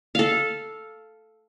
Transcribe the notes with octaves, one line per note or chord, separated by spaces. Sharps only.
A4 F5